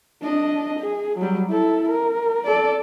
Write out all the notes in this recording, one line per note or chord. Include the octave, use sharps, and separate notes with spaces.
D4 D#5
G#4
F#3 G3
E4 A4
A#4
A4 D5